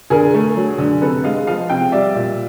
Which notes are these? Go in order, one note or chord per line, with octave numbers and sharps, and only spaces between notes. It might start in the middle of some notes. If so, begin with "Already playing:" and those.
D3 G#4 A#4
A3
F#3
D3
C3 A4 B4
G#3 D#5 F5
F3 D#5 F5
C3 F5 G5
G3 D5 E5
A#2